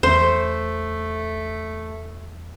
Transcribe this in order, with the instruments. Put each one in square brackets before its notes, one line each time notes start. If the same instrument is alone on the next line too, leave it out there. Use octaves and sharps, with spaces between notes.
[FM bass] E2 [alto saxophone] A3 [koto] C5